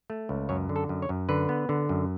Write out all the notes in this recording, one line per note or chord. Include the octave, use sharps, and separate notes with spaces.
A3
C#2
F#2 C#5
D3
A4
F#2
C#5
F#2
D3 B4
B3
D3
F#2